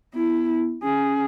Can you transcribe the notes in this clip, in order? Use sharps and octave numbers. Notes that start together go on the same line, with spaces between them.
B3 E4
C#4 G#4